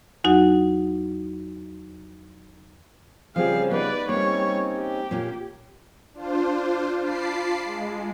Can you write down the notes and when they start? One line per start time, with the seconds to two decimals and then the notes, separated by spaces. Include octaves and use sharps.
0.24 E2 F#3 D#4 F#4 F#5
3.36 C#3 F3 G3 C4 G4 G#4 F5
3.71 B3 D#4 B4 D5
4.09 G3 A#3 C4 C#4 D#4 C#5
4.78 G4
5.11 A#2 A#3 C#4
6.14 D4 F4 C5
6.98 F4 A5 B5 D6 C7
7.65 G#3